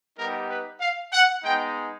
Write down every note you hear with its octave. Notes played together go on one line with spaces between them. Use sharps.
G3 B3 D#4 G4 A#4
B4
F5
F#5
G#3 B3 D#4 G5